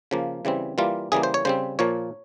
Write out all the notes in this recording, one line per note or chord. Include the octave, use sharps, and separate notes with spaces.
C#3 F3 A#3
C#3 E3 G3 C4
E3 G3 A#3 F4
C#3 E3 G3 A#3 G#4
C5
C#5
C#3 G3 C4 C5
A#2 F3 A#3 C#5